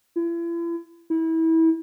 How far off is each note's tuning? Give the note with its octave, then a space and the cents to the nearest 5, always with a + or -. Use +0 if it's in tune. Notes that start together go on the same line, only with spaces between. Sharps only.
E4 +40
E4 -25